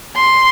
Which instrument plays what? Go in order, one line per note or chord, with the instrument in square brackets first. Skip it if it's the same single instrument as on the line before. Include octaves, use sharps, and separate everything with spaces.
[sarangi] C6